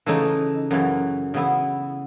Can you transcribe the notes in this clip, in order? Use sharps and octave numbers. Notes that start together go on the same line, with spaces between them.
C#3 E3 A3 D#4
F#2 C#3 E3
C#3 E3 B3 E4